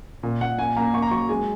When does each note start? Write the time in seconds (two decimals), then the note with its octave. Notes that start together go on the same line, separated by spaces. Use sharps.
0.23 A#2
0.41 A#2 F#5
0.58 A#3 G#5
0.76 A#3 A#5
0.94 A#3 C#6
1.02 A#5
1.11 F#3 C#6
1.29 G#3 G#5